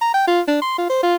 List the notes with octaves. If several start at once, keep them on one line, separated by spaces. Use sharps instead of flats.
A#5
G5
F4
D4
C6
F4
C5
F4